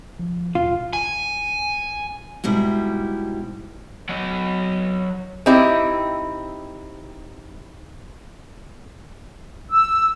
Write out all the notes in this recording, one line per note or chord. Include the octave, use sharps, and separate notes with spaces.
F3
A1 D#2 B2 F4
G#5
G#2 B2 G3 E4
F#3 D#5
C4 D#4 E4 G4
E6